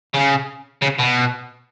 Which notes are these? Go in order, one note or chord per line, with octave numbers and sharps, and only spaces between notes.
C#3
C#3
B2